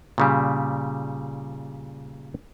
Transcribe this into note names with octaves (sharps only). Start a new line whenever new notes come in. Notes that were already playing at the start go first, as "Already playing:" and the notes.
A#2 C#3 G3